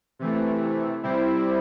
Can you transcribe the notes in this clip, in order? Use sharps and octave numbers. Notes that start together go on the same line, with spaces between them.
C3 E3 A3
C3 G3 C4 E4